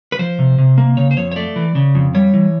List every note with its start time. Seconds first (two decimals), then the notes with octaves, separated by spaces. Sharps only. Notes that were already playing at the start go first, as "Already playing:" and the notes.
0.12 B4
0.19 F3 C5
0.39 C3
0.58 C3
0.78 A#3
0.97 C#3 C#5
1.11 C5
1.17 F2 C#5
1.32 C#5
1.36 A3 D5
1.56 E3
1.75 C#3
1.95 F2
2.14 G3 C#5
2.34 E3